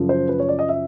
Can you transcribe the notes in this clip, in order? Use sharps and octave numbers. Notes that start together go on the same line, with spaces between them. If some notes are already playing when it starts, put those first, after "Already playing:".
Already playing: F#2 C#3 F3
C5
B4
C#5
D5
D#5
E5